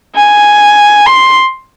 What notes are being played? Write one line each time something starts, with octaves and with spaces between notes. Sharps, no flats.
G#5
C6